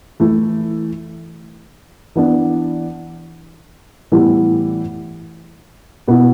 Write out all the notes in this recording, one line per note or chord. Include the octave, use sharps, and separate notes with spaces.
E3 A3 E4
E3 B3 D4
A2 E3 G3 B3 E4
B2 B3 E4